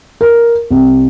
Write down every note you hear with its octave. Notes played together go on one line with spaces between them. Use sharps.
A#4
C2